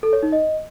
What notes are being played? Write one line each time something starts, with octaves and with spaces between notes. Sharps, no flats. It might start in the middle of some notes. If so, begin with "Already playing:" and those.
A4
C#5
D#4
D#5